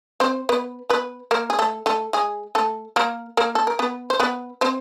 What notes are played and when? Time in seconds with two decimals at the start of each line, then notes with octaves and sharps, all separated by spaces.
0.20 C4 C5
0.49 B3 B4
0.90 B3 B4
1.31 A#3 A#4
1.50 G#4
1.59 A3 A4
1.86 A3 A4
2.13 G#3 G#4
2.55 A3 A4
2.96 A#3 A#4
3.37 A#3 A#4
3.55 A4
3.67 A#4
3.79 B3 B4
4.10 C5
4.20 B3 B4
4.61 C4 C5